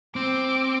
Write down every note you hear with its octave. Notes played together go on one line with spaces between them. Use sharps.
C4 D6